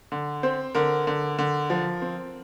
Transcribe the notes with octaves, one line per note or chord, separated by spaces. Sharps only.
D3
C4 C5
D3 A#4
D3
D3
F3
C4